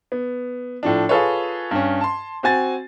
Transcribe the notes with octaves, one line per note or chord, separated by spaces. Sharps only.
B3
A2 F3 D4
F4 G#4 A4 B4 C#5
G2 C#4
A5 C6
C4 F#4 G#5 A6